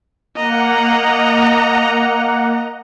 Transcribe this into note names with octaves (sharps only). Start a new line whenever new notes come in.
A#3 D#5 F#5 A#5